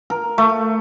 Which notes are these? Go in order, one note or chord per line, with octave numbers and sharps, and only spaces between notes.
A#4
A3